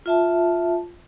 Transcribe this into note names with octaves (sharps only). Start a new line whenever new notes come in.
F4 E5 A5